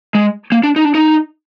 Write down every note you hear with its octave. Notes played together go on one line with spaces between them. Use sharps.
G#3
A#3
D4
D#4
D4
D#4